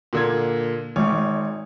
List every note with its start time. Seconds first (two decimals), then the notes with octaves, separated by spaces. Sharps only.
0.13 A#2 D3 G#6
0.96 G#1 C#5